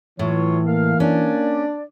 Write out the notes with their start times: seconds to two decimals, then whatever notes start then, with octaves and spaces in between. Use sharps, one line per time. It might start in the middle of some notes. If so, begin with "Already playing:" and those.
0.19 A2 E3 F#3 F4 C#5
0.67 A#3 F5
1.00 C#4 D4 D5